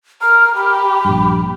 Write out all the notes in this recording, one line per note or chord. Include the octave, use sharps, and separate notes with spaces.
A#4 F6
G4 B5
A#1 G2